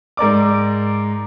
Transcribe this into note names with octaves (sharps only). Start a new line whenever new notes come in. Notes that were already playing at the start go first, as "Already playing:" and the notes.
G#2 A#4 D5 D6